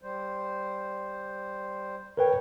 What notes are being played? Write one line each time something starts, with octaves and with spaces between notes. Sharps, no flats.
G3 C5
A#4 B4 C#5 G5